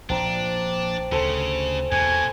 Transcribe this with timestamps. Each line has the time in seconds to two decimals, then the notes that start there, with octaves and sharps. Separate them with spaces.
0.10 A#1 A#2 C4 D4 A#5
1.12 D2 C#3 A4 C5
1.92 E2 B2 G#5